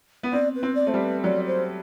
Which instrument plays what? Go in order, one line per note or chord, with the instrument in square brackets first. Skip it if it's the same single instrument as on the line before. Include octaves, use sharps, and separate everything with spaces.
[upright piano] B3
[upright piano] C4 [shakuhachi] D5
[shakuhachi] B4
[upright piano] C4
[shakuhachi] D5
[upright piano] A3 [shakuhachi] C5
[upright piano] G3
[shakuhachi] B4
[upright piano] F#3 [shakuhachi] D5
[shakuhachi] C5